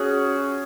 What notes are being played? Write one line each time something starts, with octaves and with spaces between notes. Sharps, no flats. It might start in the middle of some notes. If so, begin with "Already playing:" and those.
Already playing: C#4 F#4 G#4